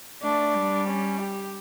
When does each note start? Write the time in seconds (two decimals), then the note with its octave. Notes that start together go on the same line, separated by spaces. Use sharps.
0.22 A3 D4
0.54 G3
0.87 C#4
1.19 G4